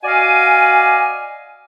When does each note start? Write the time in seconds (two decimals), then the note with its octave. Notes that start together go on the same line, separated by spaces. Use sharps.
0.04 F#4 D5 D#5 F5 G#5